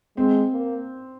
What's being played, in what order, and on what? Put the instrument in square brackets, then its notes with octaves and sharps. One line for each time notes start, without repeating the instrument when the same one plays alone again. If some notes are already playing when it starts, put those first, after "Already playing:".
[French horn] G#3 [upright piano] C4
[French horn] A#3